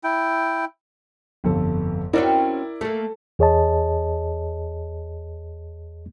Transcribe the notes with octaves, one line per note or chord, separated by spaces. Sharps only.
E4 G5
G1 F2 A4
C4 C#4 E4 F#4 A#4 D5
A3 A#3 A4
E2 G#4 C#5 D#5 A5